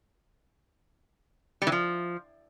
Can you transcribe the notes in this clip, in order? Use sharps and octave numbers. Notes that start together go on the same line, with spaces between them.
G3
E3
F3